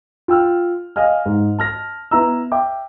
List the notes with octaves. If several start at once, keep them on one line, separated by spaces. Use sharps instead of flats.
F4 G5 E6 F6
D#5 F5 G#5 F6
G#2
A5 F6 A#6
B3 E4 A#5 E6
E5 G5 D6